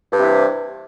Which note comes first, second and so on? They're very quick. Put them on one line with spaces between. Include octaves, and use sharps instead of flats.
G2 C3 E3